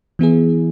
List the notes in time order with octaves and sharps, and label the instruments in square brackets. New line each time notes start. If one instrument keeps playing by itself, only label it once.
[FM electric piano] E3 B3 E4 G#4